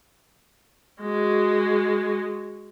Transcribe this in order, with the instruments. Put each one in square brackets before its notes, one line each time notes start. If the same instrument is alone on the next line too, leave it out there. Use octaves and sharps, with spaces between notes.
[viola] G#3 F#4